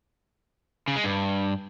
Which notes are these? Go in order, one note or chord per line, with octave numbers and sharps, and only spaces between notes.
C#3
G#3
G2